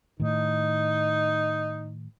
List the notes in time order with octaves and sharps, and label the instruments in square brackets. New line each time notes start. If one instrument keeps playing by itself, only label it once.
[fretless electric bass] A2 D#3 [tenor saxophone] D#4